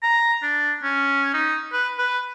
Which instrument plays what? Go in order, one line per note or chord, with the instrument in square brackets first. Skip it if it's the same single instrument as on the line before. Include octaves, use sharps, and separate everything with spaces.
[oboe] A#5
D4
C#4
D#4
B4
B4